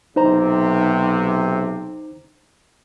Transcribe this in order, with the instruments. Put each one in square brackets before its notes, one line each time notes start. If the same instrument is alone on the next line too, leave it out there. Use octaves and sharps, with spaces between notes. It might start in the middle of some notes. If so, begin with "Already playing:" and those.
[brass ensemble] B1 C3 [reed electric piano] D#4 C5 A#5